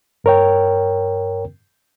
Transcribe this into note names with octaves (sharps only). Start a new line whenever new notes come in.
G2 A#4 C#5 G5